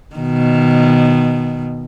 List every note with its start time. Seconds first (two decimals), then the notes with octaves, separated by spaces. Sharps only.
0.15 B2 D#3